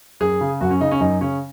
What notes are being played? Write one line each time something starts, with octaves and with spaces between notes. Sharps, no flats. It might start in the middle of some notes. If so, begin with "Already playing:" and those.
F#2 G#4
C#3
F#2 F#4
C#4
C#3 D#4
C#4
F#2 D#4
C#3 C#4